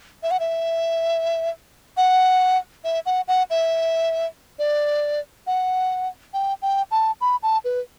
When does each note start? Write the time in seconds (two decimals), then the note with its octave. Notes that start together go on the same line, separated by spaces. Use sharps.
0.23 E5
0.31 F#5
0.40 E5
1.97 F#5
2.84 E5
3.06 F#5
3.28 F#5
3.50 E5
4.59 D5
5.47 F#5
6.34 G5
6.62 G5
6.91 A5
7.21 B5
7.43 A5
7.65 B4